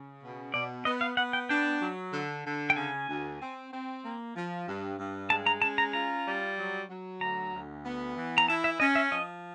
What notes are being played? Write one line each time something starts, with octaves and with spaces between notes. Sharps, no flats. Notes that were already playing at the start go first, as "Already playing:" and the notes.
Already playing: C#3
B2
B2 D5
B3 D#5
F5
B3 F#5
G5
D4 G5
F#3
D3
D3
G5
C#3 G#5
D2
C4
C4
A#3
F3
G2
G2
G#3 A5
A#5
C#4 A5
A#5
F4 A#5
G3
F#3
F#3
D2 A#5
D2
B3
E3
A#5
E4 A5
E5
C#4 D#5
E5
F3 D#5